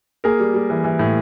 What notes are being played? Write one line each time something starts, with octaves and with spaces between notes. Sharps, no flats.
A#3 G#4 A#4
G3
G3
E3
E3
A2